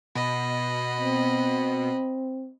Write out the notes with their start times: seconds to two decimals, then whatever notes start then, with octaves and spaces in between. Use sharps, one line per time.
0.15 B2 D#5 B5
1.00 C4